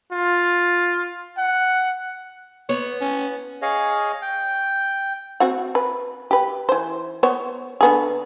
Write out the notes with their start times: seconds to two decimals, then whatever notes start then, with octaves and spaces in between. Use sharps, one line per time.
0.12 F4
1.38 F#5
2.69 B3 C#5
3.01 C#4
3.62 G#4 C#5 D#5 F5
4.22 G5
5.40 C4 F#4 F#5
5.75 B4
6.31 G4 B4
6.69 E3 C5
7.23 B3 C5 C#5
7.81 D3 B3 G#4